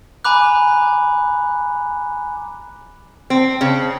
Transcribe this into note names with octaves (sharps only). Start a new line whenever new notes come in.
G#5 A#5 B5 D6 F#6
C4
C#3